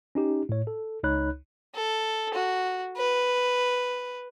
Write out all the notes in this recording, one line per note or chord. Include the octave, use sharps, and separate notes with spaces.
C#4 D#4 G4
A2 C#5
A4
C#2 D#4 C#5 B5 F#6
A4
F#4
B4